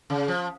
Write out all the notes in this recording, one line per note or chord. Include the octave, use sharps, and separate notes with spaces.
C#3
F3